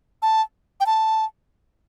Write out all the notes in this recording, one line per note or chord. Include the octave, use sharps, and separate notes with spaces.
A5
G5
A5